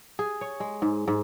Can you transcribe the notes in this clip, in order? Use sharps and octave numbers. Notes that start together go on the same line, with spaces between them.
G#4
C#5
G#3
G#2
G#2